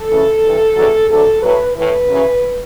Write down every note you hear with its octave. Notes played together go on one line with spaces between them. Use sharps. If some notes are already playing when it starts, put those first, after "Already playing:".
Already playing: A4
D2 C#3 E3
G2 E3
E2 D3 F#3
D2 D3 F#3 A4
A2 F#3 B4
A2 E3 B4
F#2 C#3 E3